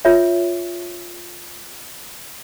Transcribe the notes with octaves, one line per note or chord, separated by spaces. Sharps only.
F4 C#5 E5